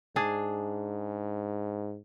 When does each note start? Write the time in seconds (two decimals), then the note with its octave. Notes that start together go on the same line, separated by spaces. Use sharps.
0.16 G#2 D4 G#4